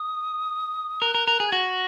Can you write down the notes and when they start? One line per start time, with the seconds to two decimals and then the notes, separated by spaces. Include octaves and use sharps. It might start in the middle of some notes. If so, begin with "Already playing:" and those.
Already playing: D#6
1.02 A#4 F#6
1.15 A#4
1.27 A#4 F#6
1.40 G#4
1.48 G#6
1.52 F#4 A#6